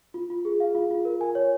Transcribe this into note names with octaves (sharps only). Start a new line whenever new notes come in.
F4
F4
G#4
F5
F4
F4
A#4
G#5
C#5